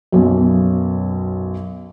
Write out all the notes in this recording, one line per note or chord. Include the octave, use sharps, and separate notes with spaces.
B1 F#2